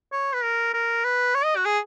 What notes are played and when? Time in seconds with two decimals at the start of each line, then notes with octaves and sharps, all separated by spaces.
0.12 C#5
0.33 B4
0.43 A#4
0.74 A#4
1.04 B4
1.35 C#5
1.45 D#5
1.56 F#4
1.65 G#4